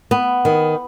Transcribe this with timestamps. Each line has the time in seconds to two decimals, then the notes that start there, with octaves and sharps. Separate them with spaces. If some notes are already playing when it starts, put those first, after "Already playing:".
0.11 B3
0.45 D#3